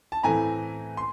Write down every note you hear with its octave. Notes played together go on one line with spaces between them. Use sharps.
A5
A2 E3 A3 C4 G#5 A#5
C6